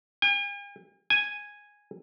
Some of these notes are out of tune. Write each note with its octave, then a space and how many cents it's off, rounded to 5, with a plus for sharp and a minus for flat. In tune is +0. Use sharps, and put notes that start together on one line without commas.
G#5 -45
G#5 -5